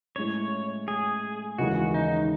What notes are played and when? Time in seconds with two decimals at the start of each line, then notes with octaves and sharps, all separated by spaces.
0.16 A2 G#3 C#4 C#5
0.88 G#4
1.58 D#2 C#3 E3 G#3 F#4
1.94 D#4